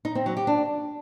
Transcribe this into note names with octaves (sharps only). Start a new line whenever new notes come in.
D#4
C4
F#3
G4
D4